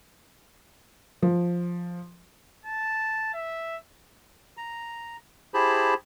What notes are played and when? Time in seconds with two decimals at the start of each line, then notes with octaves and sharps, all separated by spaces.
1.22 F3
2.65 A5
3.34 E5
4.57 A#5
5.54 E4 G4 G#4 C5 A5 B5